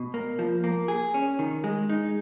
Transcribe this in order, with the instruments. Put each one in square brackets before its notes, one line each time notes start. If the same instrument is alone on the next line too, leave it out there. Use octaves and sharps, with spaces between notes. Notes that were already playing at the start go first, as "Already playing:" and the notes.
Already playing: [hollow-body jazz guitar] B2
A#3
F3
A#3
G#4
C#4
D#3
G#3
D#4